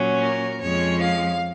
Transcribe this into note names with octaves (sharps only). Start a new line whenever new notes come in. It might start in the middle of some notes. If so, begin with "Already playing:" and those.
Already playing: A#2 F#3 C#4
A#4
F2 F3 G#3 C#4 C#5
F5